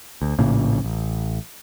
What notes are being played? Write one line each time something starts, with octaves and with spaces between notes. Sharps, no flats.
D2
A#1 A2 C#3 A#3
A1